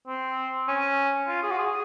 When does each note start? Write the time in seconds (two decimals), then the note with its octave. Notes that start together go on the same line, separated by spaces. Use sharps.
0.07 C4
0.68 C#4
1.28 F4
1.43 G#4
1.51 F#4
1.58 G#4